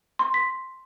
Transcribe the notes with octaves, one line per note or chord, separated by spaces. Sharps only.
C6
B6